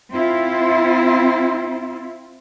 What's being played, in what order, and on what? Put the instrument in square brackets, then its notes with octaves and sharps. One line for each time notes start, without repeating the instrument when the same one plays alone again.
[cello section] C4 E4 F4